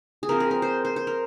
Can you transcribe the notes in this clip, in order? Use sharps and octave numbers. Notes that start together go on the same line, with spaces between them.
G#4
F3 C4 A#4
G#4
A#4
C5
C5
C5
A#4